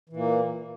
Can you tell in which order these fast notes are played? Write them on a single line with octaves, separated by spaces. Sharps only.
E3 A#2 A#3